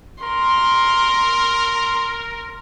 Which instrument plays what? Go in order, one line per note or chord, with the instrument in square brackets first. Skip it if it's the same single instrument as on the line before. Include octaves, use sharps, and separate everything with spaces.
[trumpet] A#4 [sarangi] C6